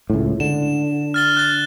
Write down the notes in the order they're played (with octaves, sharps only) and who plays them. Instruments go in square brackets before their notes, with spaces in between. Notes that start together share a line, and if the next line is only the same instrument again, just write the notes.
[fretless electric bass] C#2 A2
[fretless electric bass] D3 [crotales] E7
[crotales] F6 A6 G7
F#6 A6